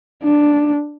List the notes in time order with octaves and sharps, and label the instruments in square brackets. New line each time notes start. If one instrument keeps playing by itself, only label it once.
[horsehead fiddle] D4